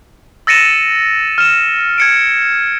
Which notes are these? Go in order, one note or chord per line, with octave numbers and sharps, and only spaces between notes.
E6 A6 A#6 C#7 D#7 E7
F6 E7
G#6 C#7 D7